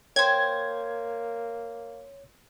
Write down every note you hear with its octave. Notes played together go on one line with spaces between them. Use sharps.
A#3 C5 C#5 G5 G#6